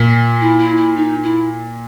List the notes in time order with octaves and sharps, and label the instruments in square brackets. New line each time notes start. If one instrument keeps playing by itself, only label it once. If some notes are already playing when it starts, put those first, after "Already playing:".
Already playing: [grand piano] A#2
[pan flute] E4
E4
E4
D#4
E4